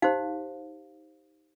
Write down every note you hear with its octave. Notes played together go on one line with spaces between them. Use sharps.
D#4 G4 C5 F5